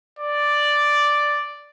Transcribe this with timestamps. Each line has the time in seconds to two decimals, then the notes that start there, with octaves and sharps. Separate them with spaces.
0.19 D5